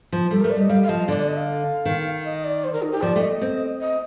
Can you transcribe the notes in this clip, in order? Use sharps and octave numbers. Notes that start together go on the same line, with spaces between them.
F3
G3 A4
A3 A#4
D5
G3
D#5
G3 F5
F5
F3 D#5
D3 D5
D5
D#5
F5
D#3
D#5
D5
C5
A#4
D#4
G4
F3 D5
A3
D#5
C4
D#5